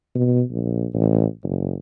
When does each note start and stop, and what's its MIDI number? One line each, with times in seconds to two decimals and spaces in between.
0.15 0.42 47
0.51 0.86 34
0.94 1.25 33
1.43 1.75 30